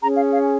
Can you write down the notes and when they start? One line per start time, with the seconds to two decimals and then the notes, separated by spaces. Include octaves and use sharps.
0.02 C#4 G#4 C#5 A#5
0.17 F5
0.31 F5